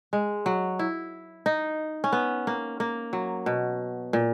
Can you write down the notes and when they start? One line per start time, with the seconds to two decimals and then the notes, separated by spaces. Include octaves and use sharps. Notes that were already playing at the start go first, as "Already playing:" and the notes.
0.13 G#3
0.46 F#3
0.79 E4
1.46 D#4
2.04 C#4
2.12 B3
2.47 A#3
2.80 A#3
3.13 F#3
3.46 B2
4.13 A#2